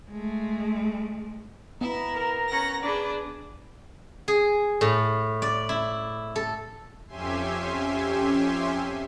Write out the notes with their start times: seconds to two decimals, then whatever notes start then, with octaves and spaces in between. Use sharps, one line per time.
0.10 G#3 A3
1.81 B3 E4 A#5
2.14 A#4
2.48 C#4 F#5 A#6
2.82 D4 G#4 B4 D5
4.28 G#4
4.81 A2
5.42 D5
5.69 E4
6.36 A4
7.07 F2 C#4 G4 E5 G#5 C6